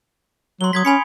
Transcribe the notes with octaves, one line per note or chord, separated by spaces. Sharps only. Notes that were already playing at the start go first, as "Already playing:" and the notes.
F#3 C6 G7
F#3 D#6 G#6 B6
C#4 G#5 B5 C#7